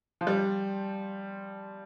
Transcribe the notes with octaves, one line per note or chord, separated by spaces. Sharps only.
F3
G3